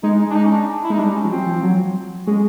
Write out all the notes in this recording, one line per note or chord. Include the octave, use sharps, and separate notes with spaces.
G#3 D#4
D#4
D4
D#4
C#4
D4
E4
G#3 D#4
G3 D4
C#4
F3
F#3 C4
F3
F#3
G#3 C#4